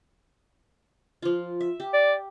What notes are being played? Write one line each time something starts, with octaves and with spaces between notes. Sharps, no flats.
F3 F4
E5
G4
D5